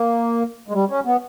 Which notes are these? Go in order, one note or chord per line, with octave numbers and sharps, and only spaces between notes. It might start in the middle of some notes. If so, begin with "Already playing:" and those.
Already playing: A#3
G#3
G3
C#4
B3